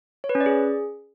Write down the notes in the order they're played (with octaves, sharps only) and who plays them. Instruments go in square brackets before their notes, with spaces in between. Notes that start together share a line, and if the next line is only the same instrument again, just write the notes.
[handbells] C#5
B4
C#4
D5
G#4